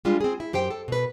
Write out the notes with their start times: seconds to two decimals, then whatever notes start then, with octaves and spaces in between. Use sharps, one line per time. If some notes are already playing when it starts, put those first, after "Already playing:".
0.05 G3 G#3 D4 F4
0.21 C4 G#4
0.40 E4
0.53 F#2 G4 C5 G5
0.70 A4
0.88 B2 B4